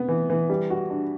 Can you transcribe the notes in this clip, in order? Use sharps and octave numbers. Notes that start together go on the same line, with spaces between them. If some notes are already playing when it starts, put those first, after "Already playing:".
Already playing: C3 B3
E3
E3
G3
F#4
D4